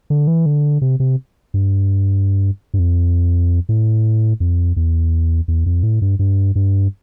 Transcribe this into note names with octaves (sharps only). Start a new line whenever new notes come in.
D3
E3
D3
C3
C3
G2
G2
F2
A2
F2
E2
E2
F2
A2
G2
G2
G2